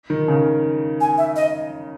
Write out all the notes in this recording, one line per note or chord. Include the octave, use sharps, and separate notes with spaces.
D#3
C#3
G#5
E5
D#5